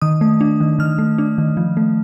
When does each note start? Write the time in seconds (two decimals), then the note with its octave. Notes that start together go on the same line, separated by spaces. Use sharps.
0.02 D#3 D#6
0.21 A3
0.41 D4
0.60 D#3
0.79 D#3 F6
0.98 A3
1.18 D4
1.38 D#3
1.57 F3
1.77 A3